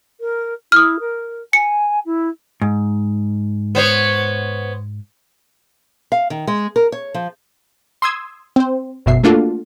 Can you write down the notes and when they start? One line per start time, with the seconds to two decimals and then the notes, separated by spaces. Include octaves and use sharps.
0.20 A#4
0.72 E4 D#6 F6
0.99 A#4
1.53 G#5 C#7
2.05 E4
2.62 G#2
3.75 B3 C5 C#5
6.12 F5
6.30 D#3
6.47 G#3
6.76 A#4
6.92 C#5
7.14 F3
8.02 C6 D#6 E6 G#6
8.56 C4 C5
9.06 G1 F#2 B2 E5 C7
9.23 A3 A#3 D4 F4 F#4 A4